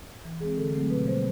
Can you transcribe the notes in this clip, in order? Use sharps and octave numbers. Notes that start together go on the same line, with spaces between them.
E3
G#3 C4 G#4
D3 A4
F#3 A3 C4
B2 B4
G3 A#3 C5